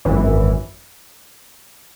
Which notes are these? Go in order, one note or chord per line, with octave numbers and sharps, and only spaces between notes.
G#1 F#2 E3